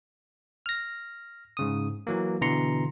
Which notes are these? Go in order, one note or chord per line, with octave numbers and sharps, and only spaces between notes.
F6 A#6
G#2 C#3 D#6
E3 F#3 A#3
B2 D3 E3 A#5 C6 C#7